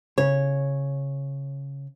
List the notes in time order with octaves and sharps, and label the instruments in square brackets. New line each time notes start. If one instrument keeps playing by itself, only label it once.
[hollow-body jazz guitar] C#3 [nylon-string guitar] C#5